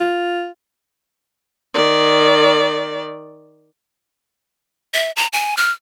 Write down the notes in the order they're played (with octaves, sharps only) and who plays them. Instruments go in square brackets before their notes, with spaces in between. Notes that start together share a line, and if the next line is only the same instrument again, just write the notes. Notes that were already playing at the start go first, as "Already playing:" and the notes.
[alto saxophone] F4
[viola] D#3 D5
[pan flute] E5
A#5
G#5
F6